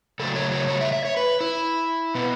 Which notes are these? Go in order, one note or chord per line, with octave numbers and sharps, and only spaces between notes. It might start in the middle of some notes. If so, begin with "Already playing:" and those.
C#3 F#3 A3 A4
C#5
C#5
C#5
E5
E5
C#5
B4
E4
B2 B3